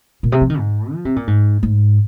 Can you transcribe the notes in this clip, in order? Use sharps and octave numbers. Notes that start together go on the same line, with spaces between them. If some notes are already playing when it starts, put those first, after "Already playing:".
A#2
C3
F3
D#3
G#2
F3
C3
A#2
G#2
G#2